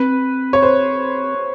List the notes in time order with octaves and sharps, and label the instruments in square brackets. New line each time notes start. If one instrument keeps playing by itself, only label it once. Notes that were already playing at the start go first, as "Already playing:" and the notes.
Already playing: [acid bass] C4 [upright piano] B4
[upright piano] C#5
C5